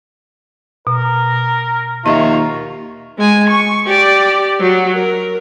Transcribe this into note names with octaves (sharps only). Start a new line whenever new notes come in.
B2 A#4
D#2 F4 D#5 E5 A#5 C#6
G#3 G#5
C#6
G4 D5
F#3
A#4